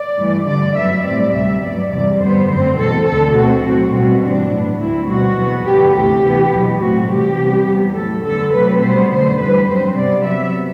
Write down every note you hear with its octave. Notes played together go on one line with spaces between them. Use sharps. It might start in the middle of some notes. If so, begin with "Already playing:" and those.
Already playing: D5
G2 E3 A3
G2 D3 A3 D5
F#2 F#3 B3 E5
A2 G3 C4 D5
D2 C3 G3 E5
G2 F#3 B3 D5
E2 C3 G3 D5
G2 D3 G3 B3 C5
F#2 D3 A3 C4 C5
E2 B2 A3 A4
D2 D3 A3 A4
B2 A3 C4 F#4
A2 F#3 A3 C4 F#4
B2 G3 C4 F#4
G2 E3 A3 C4 D4
A2 F#3 B3
D2 D3 A3 C4 E4
B2 G3 C4 F#4
E2 B2 F#3 B3
G2 D3 F#3 B3 G4
D2 C3 E3 A3 G4
C3 E3 B3
E2 B2 F#3
A2 F#3 A3 C4 F#4
C3 E3 G3 G4
C3 G3 B3
E2 C3 G3 B3
A2 F#3 A3 A4
F#2 D3 F#3 B3 A4
C3 F#3 A3 C4 B4
B2 G3 B3 C5
F#2 D3 A3 C5
E2 D3 G3 B4
G2 F#3 C4 C5
C3 G3 B3 D5
C3 F#3 B3 E5